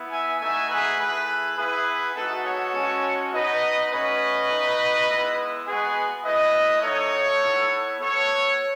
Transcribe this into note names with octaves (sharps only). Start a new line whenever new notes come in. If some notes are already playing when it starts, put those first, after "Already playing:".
Already playing: B3 E4
E5 G#5
A3 D#4 F#4 E5 G#5
G#4 B4
A3 E4 G#4 B4
B3 E4 G#4 B4
G#3 B3 D#4 F#4 A4
A4 C#5
G#3 C#4 F#4
B3 D#4 F#4 B4 D#5
A3 C#4 F#4 B4 D#5
A3 D#4 F#4
G#3 B3 E4
G#3 B3 F#4 G#4 B4
A3 E4 B4 D#5
A3 D#4 F#4 A4 C#5
B3 E4
B3 F#4 A4 C#5